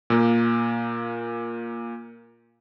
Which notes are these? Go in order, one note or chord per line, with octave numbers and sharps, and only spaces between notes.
A#2 A#3